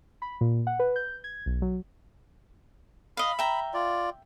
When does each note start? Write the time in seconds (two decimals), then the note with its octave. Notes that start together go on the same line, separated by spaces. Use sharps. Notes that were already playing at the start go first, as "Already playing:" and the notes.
0.22 B5
0.41 A#2
0.67 F#5
0.79 B4
0.96 G6
1.24 G#6
1.46 B1
1.62 F#3
3.17 D#5 F5 B5
3.39 E5 G5 A#5
3.74 F4 D5